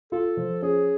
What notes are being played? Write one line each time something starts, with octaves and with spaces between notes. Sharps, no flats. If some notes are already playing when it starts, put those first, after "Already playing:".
F4 A4
F3
C#4 G#4